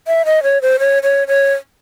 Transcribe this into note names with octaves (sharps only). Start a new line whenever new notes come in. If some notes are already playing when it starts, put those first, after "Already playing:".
E5
D#5
C#5
C5
C#5
C#5
C#5